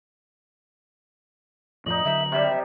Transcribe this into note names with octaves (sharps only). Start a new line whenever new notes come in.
F2 A2 F3 D#4 D#5 F#7
D3 F#3 E5
C3 G3 E5